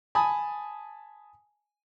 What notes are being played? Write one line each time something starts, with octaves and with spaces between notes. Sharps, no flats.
G#5 A5 B5 D#6